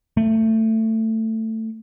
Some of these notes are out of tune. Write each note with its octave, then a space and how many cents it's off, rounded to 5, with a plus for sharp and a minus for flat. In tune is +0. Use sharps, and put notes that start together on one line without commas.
A3 +15